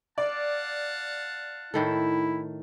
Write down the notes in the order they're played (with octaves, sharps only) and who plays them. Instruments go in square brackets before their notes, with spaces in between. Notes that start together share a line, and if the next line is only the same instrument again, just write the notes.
[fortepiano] D5 [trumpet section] F5 F#5 A5
[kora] A2 D#3 A4 [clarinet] E4